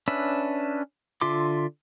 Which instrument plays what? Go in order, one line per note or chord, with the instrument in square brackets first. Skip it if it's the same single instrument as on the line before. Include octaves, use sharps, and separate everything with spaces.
[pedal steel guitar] C#4 D4 B4 E5
D3 F4 E5 C6 D6